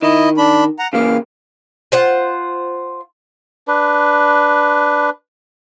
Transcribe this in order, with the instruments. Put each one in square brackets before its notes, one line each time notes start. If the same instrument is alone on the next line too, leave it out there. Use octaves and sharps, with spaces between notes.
[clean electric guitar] D#3 [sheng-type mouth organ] E4 D#5
[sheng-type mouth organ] D4 B5
F#5 A#5
[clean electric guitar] C#3 E3 A#3 [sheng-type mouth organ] F5
[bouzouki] F4 C5 F#5
[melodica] D4 B4